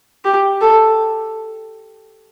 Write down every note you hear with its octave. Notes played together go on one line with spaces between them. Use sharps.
G4
A4